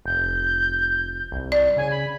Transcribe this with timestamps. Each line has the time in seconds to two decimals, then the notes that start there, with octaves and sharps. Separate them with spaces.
0.05 F1 G6
1.32 C2
1.52 D5
1.77 C#3 G#5
1.90 B5